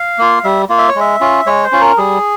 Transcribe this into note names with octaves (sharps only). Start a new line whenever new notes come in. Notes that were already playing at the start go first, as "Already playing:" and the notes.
Already playing: F5
A#3 F4
G3 E5
A#3 F4
E5
C#5
G#3 E5
C#4 F4
G#3 C#5
C5
C#4 F4
A#4
G3 G#4